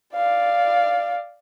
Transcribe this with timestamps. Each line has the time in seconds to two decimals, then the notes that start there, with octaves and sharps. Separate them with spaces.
0.14 D5 F5